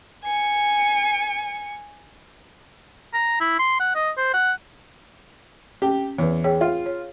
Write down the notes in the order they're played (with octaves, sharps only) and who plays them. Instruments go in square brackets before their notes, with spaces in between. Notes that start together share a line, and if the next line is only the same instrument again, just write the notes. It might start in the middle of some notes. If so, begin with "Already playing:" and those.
[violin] G#5 C#7
[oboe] A#5
E4
C6
F#5
D#5
C5
F#5
[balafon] C#4 [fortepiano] G4
[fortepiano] E2 [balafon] B4 C#5
[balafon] G#4 C#5 G5
[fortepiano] F4
[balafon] C#5